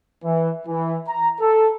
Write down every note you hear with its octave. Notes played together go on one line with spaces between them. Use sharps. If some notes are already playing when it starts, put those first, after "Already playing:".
E3
E3
A#5
A4